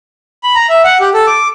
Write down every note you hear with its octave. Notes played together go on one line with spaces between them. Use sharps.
B5
A#5
E5
F#5
G4
A4
D6